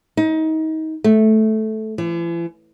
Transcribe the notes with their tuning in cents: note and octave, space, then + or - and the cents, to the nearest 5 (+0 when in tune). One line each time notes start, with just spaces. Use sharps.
D#4 +30
A3 -10
E3 +45